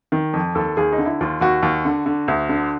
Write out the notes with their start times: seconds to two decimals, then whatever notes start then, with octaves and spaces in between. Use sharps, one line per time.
0.12 D#3
0.33 F2
0.55 D#2 A4
0.77 D#2 G#4
0.92 D#4
0.98 D3
1.05 E4
1.21 D#2 F4
1.41 D#2 F#4
1.62 D#2
1.85 D3
2.06 D3
2.28 D2
2.49 D3